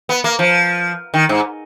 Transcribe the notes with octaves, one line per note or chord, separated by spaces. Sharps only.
B3
A#3
F3
D#3
G#2